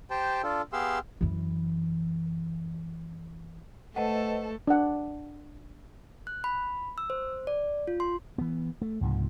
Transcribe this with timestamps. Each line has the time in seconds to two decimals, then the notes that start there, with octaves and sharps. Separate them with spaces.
0.10 G4 C5 G5 A5
0.43 D4 F4 A4
0.73 B3 G4 G#4 F5 C6 E6
1.21 F#2 E3
3.96 A3 A4 B4 C5 D#5 F#5 A5
4.68 D4 F#5
6.27 F#6
6.44 B5
6.98 E6
7.10 C5
7.47 D5
7.87 F4
8.00 C6
8.38 E3 B3
8.82 A3
9.01 C#2 G#2 C3 F3